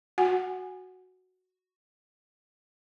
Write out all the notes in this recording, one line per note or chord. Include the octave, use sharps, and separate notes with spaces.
F#4 F#5 G#5